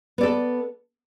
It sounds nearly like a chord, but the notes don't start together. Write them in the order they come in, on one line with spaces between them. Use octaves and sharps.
B3 D5 A4